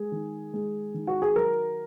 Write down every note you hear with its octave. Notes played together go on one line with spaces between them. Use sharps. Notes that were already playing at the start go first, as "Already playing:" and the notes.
Already playing: G#3 G#4
D#3
G#3
D#3
F#4
G#4
F#3 A#4